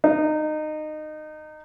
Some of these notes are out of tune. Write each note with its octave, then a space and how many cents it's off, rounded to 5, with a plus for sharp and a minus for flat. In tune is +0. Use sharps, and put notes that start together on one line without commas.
D#4 -20